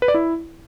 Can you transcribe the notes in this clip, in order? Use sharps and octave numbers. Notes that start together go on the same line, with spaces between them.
B4
D5
E4